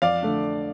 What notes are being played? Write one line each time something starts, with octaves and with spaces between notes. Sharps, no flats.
F2 D5 F5
D3 A3 D4